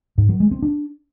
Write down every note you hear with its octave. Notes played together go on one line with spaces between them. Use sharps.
G#2
F#3
G#3
C4
D4